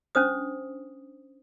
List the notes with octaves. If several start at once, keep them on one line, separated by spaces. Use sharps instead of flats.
C#4 D4 C5 D#6